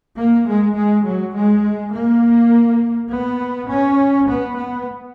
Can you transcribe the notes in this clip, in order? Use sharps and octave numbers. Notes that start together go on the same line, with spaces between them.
A#3
G#3
G#3
F#3
G#3
A#3
B3
C#4
B3
B3